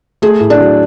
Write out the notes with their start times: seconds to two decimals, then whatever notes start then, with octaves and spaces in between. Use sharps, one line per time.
0.22 A3 G#4
0.40 A2
0.50 D4
0.60 F#3